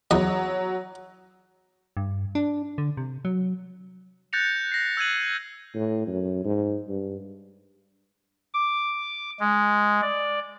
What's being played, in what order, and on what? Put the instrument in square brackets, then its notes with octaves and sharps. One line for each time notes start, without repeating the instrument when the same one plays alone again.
[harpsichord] E2 D#5 [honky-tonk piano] F#3
[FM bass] G2
D4
D3
C3
F#3
[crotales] F#6 G6 A6 A#6 C#7 F7
A#6 C7
E6 F#6 G#6 D#7 F#7
[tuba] A2
F#2
G#2
G2
[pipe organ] D6
G#3
D5